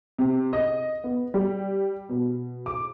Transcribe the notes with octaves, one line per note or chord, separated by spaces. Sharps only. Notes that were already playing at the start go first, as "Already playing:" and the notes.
C3
D#5
B3
G3
B2
D6